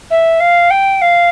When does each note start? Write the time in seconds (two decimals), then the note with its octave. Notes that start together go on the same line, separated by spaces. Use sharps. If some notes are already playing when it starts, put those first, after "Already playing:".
0.10 E5
0.40 F5
0.70 G5
1.01 F5